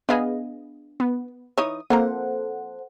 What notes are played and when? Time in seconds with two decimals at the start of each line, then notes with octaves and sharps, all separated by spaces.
0.09 B3 D4 G#4 D#5 F5 B5
1.00 B3
1.58 E3 D#4 C#5 D#6
1.90 F3 A#3 C4 A4 C5 F#5 A#5